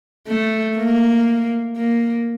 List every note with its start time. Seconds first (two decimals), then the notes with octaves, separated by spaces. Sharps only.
0.28 A3
0.77 A#3
1.77 A#3